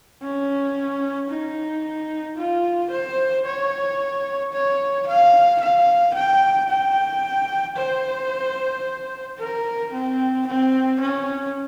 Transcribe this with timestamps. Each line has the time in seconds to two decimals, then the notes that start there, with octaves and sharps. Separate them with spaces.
0.22 C#4
1.30 D#4
2.38 F4
2.91 C5
3.45 C#5
4.53 C#5
5.08 F5
5.61 F5
6.14 G5
6.70 G5
7.77 C5
9.39 A#4
9.93 C4
10.47 C4
11.01 C#4